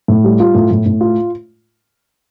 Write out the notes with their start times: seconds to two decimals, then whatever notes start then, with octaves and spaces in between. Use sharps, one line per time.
0.08 A2
0.24 G3
0.40 F4
0.55 A2
0.71 A2
0.86 A2
1.01 F4